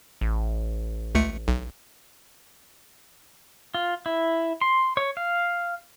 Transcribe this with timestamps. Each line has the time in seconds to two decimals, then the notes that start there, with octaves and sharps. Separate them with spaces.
0.21 A1
1.15 C#2 A3 C#7
1.48 B1
3.75 F4
4.06 E4
4.61 C6
4.97 C#5
5.17 F5